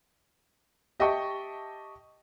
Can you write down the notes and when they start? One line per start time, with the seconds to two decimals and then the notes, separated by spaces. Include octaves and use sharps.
1.00 G4 D#5 E5 G5 A5 C#6